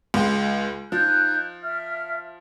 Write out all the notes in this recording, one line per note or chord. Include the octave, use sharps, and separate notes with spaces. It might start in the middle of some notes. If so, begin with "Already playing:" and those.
C#2 G#3
F3 D#4 F#6 G6
E5 F6